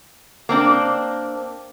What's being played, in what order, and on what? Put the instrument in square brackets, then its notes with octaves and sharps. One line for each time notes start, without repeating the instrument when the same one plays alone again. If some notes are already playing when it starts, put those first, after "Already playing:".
[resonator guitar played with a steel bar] A#3 C4 D4